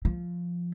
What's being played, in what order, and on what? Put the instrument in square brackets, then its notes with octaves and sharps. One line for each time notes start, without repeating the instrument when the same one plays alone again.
[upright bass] F3